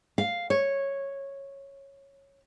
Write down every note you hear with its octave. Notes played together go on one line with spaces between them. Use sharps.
F5
C#5